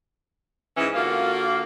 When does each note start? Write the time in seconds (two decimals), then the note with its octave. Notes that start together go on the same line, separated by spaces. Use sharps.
0.76 G#2 E3 C#4 E4
0.93 D3 A#3 F4 F#4